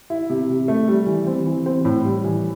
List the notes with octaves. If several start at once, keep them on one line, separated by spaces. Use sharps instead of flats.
E4
C3
C3
A3
G3
E3
C4
E3
C4
A2
G3
E3